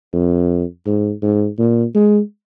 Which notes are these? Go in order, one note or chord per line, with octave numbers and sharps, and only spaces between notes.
F2
G#2
G#2
A#2
G#3